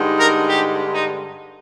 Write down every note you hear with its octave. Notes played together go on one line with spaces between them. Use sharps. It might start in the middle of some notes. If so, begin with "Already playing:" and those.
Already playing: G2 D3 G#3 D#4
A#4
G4
D#4